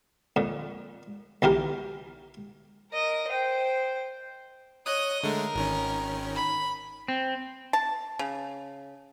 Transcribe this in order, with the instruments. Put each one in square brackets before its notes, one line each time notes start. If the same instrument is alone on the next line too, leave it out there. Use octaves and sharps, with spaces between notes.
[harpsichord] F2 A#2
B1 E3 G4 A#4
[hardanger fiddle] A#4 D#5
C5 G5
[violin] C#5 D#5 [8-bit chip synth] D#6 F#6
[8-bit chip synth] D3 G#3 A3 [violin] A#4
[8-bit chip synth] G#1 D#3 C#4
[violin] B5
[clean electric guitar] C4
[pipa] A5
C#3